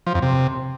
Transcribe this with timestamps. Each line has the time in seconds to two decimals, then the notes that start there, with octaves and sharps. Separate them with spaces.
0.07 F3
0.14 F2
0.22 C3